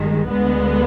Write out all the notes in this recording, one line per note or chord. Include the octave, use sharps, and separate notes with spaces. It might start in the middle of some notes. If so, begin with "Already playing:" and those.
Already playing: G1 G2 D#3 G#3
D2 D3 G#3 B3